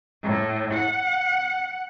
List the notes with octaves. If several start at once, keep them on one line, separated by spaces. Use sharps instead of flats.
A2
F#5